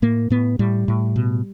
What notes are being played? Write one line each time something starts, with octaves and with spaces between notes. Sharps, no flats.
A2 A#3
A2 B3
A2 G3
A2
B2